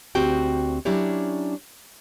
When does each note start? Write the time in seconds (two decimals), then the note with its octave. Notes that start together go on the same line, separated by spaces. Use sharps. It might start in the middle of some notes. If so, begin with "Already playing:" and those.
0.15 D2 C4 F#4 G4 G5
0.85 F#3 C#4 D4 E4 G4 C#5